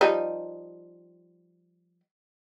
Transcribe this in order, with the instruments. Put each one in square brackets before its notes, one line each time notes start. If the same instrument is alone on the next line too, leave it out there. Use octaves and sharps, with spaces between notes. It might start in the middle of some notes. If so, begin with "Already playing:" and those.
[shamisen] F3 G3 D#4